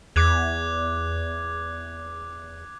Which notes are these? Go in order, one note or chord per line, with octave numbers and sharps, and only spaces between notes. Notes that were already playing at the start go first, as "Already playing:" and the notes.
E2 D6 F#6 G#6